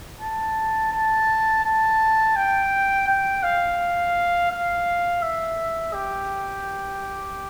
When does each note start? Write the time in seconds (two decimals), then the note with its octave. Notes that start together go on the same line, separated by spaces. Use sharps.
0.21 A5
0.93 A5
1.64 A5
2.36 G5
3.08 G5
3.43 F5
4.50 F5
5.22 E5
5.94 G4